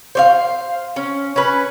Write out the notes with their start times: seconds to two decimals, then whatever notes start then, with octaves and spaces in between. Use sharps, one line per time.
0.15 C5 C#5 F5
0.96 C#4
1.36 C#4 B4